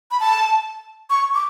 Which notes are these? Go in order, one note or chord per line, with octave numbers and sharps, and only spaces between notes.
B5
A5
C#6
D6